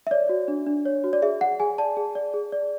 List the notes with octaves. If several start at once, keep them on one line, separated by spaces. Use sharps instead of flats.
E5
C#5 D5
F#4
D4
D4
C#5
F#4
D5
G#4 E5
D5 F#5
G#4 G#5
D5 A5
G#4
D5
G#4
D5